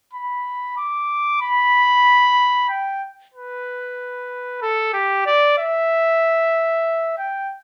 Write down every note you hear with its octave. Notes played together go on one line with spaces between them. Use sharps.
B5
D6
B5
G5
B4
A4
G4
D5
E5
G5